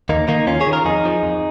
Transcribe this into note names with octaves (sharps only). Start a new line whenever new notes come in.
D#2 A#3 D#4
D#3 A#3 D#4
D#2 C#4 F4
G#4 C#5
D#3
F4 A#4
F2 D#4 G#4
F3
F2